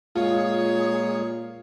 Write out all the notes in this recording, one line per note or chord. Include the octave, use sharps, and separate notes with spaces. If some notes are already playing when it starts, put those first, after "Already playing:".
A#2 G#3 F4 G#4 C#5